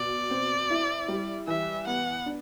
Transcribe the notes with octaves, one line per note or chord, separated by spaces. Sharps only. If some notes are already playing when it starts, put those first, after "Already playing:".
Already playing: B2 D5
C4
E4
G3
E3 E5
B3 F#5
D4